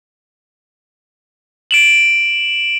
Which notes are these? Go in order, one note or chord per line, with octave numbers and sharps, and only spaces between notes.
D7 E7 F#7